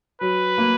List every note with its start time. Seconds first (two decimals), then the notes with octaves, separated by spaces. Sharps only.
0.21 F#3 B4
0.58 A#3